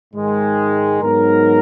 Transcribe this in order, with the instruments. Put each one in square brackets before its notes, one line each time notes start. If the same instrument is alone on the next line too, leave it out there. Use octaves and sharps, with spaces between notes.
[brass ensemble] G#2 D#3 G#3
G#2 F#3 B3 D#4 A#4